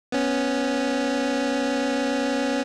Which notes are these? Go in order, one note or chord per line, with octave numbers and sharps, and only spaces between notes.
B3 C#4